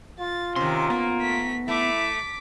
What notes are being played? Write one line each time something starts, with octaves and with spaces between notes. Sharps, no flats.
F4 A6
C3 D#3 C#4 C6
A#3 B3
A3 B6
A3 E4 D6 B6